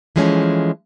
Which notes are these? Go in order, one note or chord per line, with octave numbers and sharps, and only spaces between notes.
E3 F3 G#3 A3 C#4